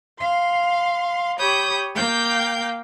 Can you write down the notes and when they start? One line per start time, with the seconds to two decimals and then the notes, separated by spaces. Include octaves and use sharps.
0.19 F5 C6
1.39 G4 C#5 B5 D#6 G6
1.95 A#3 F5 G5 G6